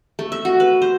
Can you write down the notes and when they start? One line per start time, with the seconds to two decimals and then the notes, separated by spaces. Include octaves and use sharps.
0.19 A3
0.32 E5
0.45 F#4
0.60 B4
0.82 C5